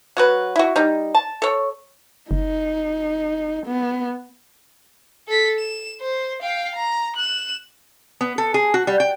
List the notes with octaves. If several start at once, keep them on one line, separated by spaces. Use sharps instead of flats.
F#3 F#4 B4
E4 F#4
G3 D#4
A5
A4 C#5
F#1 D#4
B3
A4 B6
E7
C5
F5 G5
A#5
F#6 E7
B3
A4
G#4
F#4
G3
G5